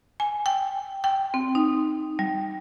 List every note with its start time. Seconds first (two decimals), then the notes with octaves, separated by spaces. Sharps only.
0.20 G#5
0.46 G5
1.04 G5
1.34 C4
1.55 D#4
2.19 G3